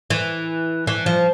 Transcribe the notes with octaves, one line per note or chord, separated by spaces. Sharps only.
E3
E3
F3